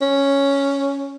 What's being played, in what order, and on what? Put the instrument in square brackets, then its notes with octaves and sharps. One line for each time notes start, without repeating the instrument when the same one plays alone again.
[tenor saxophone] C#4